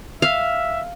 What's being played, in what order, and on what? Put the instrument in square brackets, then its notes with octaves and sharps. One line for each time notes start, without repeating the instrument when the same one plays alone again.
[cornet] E5 [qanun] F5